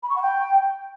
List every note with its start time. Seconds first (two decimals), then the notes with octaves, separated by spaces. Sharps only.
0.03 B5
0.09 C#6
0.16 F#5
0.22 G5